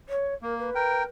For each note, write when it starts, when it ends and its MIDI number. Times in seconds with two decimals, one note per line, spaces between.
0.08 0.34 73
0.42 0.70 58
0.42 0.56 70
0.58 1.06 71
0.75 1.04 70
0.75 1.04 79